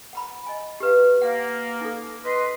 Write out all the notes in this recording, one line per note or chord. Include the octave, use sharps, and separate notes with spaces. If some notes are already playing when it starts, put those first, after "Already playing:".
F#5 A#5 B5
D#5 G#5
G4 B4 F5
A#3 F#5
D#4 A4
B4 D#5 C6